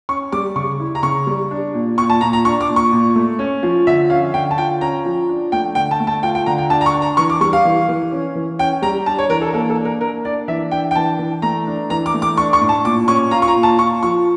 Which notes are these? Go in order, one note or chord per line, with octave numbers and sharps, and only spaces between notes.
C#4 C#6
G3 D6
C#3 C#6
E4
A#5
C#3 C#6
G3
D4
A#2
A#2 C#6
A5
A#2 A#5
A#5
D4 C#6
D6
A#2
C#6
A#2
A3
C#4
F3
D3 E5
C#4 F5
D3 G5
A5
F4 G5
C#4 A#5
F3
D4
A3 G5
D3 G5
A5
A3
A5
F4 G5
G5
D3 A#5
G5
D4 A5
A#5
C#6
D4
A#5
E3 C#6
D6
G3 C#6
F5
E3
E3
C#4
E3
C#4 G5
G3 A#5
D4 A5
C#5
E3 A#4
A4
A#3 A4
A4
D4
A#4
A#3 A#4
D4 D5
E3 E5
D4 G5
G5
E3 A5
E3
A3 A#5
D4
E3 A#5
D6
A3
D6
D4 C#6
C#6
A2
A5
A#2 D6
C#4 C#6
F4 A#5
C#6
A#5
A#2
A5
F4 C#6
F3 C#6